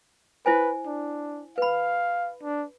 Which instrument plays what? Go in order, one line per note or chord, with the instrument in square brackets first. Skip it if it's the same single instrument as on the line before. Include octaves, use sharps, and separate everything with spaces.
[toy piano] E4 C5 G#5 [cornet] B4
[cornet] D4
[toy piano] B4 B5 [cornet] F5
[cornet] D4